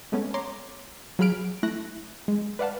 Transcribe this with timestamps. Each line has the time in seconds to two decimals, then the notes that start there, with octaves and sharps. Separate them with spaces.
0.12 G#3 A3 B3 C#4
0.34 C#5 A#5 C6 D6
1.19 F#3 F4 G#4 B5 F6 D7
1.63 A3 E4 F#6 A#6
2.28 G#3
2.59 B4 D5 F5 F#5 A5